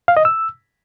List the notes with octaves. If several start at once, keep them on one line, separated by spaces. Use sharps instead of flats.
F5
D#5
E6